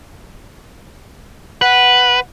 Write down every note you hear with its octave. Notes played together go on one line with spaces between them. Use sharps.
B4 F#5